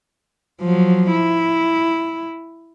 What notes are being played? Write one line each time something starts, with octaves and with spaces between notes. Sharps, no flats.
F3 F#3
E4